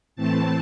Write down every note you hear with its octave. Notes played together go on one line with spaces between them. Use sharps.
A2 E3 A3 C4 A5